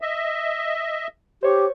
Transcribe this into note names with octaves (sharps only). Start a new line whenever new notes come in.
D#5 E5
G4 C5 C#5 C#6